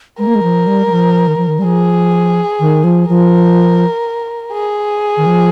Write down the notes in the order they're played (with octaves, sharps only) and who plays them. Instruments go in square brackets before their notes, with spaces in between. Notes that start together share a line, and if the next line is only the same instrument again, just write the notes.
[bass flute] G#3 [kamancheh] A#4
[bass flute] A#3
G#3
F3
G3
G3
F3
D#3
F3
D#3
G3
[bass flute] F3 [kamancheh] G#4
[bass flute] D#3
F3
[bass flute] F3 [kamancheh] A#4
[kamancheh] G#4
[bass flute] D#3
F3